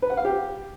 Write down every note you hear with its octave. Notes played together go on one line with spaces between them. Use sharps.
B4
F#5
F5
G4